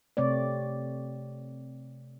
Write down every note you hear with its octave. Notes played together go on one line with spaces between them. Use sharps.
C3 A3 C4 C#5 D5